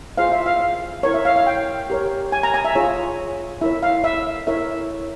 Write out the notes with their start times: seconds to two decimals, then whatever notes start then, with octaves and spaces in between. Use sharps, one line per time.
0.18 F4 G#4 C5 F5
0.32 E5
0.46 F5
0.60 F5
1.03 E4 A#4 C#5
1.14 E5
1.25 F5
1.36 F5
1.47 G5
1.90 G4 A#4 C#5
2.32 G#5
2.43 A#5
2.54 G#5
2.65 E5
2.75 F4 G#4 C#5
3.61 E4 A#4 C#5 E5
3.83 F5
4.04 E5
4.47 E4 A#4 C#5 E5